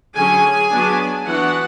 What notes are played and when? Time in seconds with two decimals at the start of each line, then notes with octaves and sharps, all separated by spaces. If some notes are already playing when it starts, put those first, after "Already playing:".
0.15 D3 F#3 C#4 G#4 G#5
0.72 F#3 B3 D4
1.26 E3 B3 D4 F#4 F#5